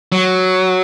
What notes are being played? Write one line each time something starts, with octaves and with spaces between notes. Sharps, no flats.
F#3